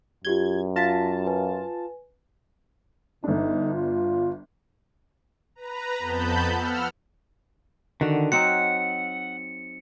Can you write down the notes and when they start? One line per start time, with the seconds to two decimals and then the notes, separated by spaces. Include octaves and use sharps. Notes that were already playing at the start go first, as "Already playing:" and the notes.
0.25 F#2 F4 G4 G#6 G7
0.76 F4 A5 A#6 B6
1.27 B4 G#5
3.24 G1 D3 D4 D#4
3.74 F4
5.55 B4 A#5
5.99 F2 B3 A5 B5 G6
6.51 F#5 E6 F6
8.01 D3 D#3 F#4
8.32 F#3 C4 D#4 F#5 C#7